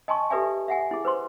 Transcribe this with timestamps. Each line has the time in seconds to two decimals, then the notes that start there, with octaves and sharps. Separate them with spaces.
0.08 D#5 G#5 A5 C6 C#6
0.30 G4 A4 B4 D5 E5 G#5
0.68 E5 F#5 G#5
0.91 E4 G#4
1.05 B4 C5 C6